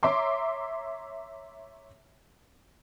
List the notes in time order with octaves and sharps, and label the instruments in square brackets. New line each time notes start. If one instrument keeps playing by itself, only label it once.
[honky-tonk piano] C#5 E5 A#5 C6 D6